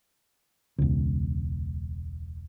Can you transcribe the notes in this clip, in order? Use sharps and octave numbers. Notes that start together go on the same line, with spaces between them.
E1 C#2